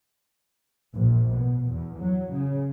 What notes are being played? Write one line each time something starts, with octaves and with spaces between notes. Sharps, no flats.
A#1
B2
E2
F#3
C#3